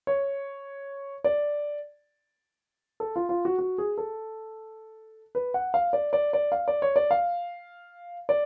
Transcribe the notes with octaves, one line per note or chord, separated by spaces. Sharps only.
C#5
D5
A4
F4
F4
F#4
F#4
G#4
A4
B4
F#5
F5
D5
D5
D5
F5
D5
C#5
D5
F5
D5